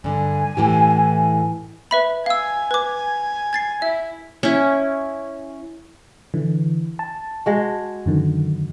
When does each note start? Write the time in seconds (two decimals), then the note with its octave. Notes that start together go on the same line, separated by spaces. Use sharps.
0.04 G2 D3 G#5
0.57 A2 E3 G4
1.91 B4 E5 B5
2.26 F5 G#5 E6
2.71 B4 D6
3.53 G#6 A6 C7
3.82 E4 E5
4.43 C#4 E4
6.34 D3 E3
6.99 A5
7.46 G#3 F#4
8.06 F#2 D3 D#3